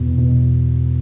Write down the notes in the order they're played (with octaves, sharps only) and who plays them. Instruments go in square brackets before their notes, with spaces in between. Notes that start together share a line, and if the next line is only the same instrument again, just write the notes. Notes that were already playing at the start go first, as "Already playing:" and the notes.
Already playing: [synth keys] E2 B2
B2